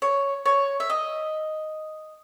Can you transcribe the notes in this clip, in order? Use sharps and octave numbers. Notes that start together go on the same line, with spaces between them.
C#5
C#5
E5
D#5